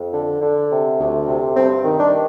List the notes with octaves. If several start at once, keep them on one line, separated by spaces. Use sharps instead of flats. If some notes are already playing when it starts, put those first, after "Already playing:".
Already playing: F2
D3
D3
C3
D2
C3
G2 C4
D#3
D4